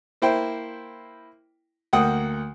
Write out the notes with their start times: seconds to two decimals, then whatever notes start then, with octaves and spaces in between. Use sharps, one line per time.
0.22 A#3 E4 C5 G5
1.93 D2 A#3 F#5 G5 D#6